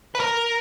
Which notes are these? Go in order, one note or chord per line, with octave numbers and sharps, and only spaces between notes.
B4
A#4